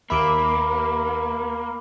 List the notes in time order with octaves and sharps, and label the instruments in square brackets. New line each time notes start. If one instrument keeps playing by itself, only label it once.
[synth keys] D#2 E5 [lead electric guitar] A#3 [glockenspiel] B5 D6 D7